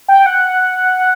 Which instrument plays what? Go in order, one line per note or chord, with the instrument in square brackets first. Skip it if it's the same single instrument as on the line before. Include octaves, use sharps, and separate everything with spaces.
[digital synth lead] G5
F#5